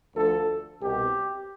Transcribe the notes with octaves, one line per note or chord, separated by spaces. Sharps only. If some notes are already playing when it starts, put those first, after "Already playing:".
D2 D3 F3 A4
C2 B2 G4